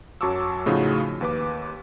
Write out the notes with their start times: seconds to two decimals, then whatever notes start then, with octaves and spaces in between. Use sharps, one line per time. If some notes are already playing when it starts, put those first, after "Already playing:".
0.21 F#2 F#3 A5 C#6 D6 E6
0.66 A2 C#3 F3 D#4 F4 F#4
1.21 D#2 B4 D6